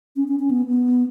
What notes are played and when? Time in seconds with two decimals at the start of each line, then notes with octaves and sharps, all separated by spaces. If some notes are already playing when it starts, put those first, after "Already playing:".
0.16 C#4
0.28 C#4
0.39 C#4
0.51 B3
0.67 B3